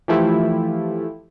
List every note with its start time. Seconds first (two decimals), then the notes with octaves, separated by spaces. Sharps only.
0.08 E3 F3 A3 E4 F4 G4